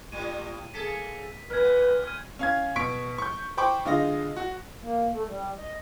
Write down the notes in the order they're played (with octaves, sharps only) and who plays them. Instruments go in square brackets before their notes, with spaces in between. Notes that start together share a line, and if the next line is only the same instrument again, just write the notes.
[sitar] A2 G3 A#3 [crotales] D#7
[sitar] A#3 G#4 A4 [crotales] B6
[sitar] A#2 B3 [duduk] B4 [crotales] F6 G#6
[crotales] F6 G#6 D#7
[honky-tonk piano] C#4 F5 G#6
B2 C#6 B6 D7
C#6 G6
C5 G5 B5 C#6 D6
D3 G#3 F4 D#5 A#6
F#4
[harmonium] A#3
A3
G3
D#5